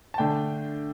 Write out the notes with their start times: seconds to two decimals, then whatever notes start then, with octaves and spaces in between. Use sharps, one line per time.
0.14 A5
0.18 D3 A3 D4 G5